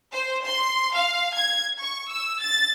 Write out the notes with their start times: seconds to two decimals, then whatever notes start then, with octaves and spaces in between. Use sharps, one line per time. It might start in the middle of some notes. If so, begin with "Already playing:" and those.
0.12 C5
0.45 C6
0.93 F5
1.35 G#6
1.80 C#6
2.09 E6
2.39 A6